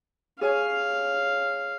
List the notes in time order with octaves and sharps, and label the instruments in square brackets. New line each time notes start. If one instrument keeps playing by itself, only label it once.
[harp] G#4 C#5 G#5 [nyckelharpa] F5